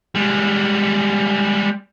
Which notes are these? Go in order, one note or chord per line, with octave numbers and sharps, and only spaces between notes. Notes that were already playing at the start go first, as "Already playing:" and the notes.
G3 G#3